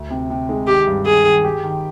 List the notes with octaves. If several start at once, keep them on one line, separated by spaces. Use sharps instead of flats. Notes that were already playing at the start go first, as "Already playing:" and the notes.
Already playing: D2
C3
C3
G#3
D#3 G4
G2
D#3 G#4
D#3
G4
D#3